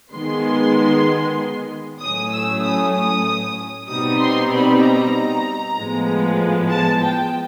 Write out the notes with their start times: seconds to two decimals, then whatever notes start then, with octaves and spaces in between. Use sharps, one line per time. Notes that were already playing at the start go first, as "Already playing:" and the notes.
0.12 D#3 G#3 B3 C6
2.00 A2 F#3 A3 C#4 D#6
2.31 E6
2.63 D#6
2.94 D#6
3.89 B2 G3 C4 D#4 D#6
4.20 C6
4.52 B5
4.82 A#5
5.77 A2 F3 G#3 B3
6.71 A5
7.03 G5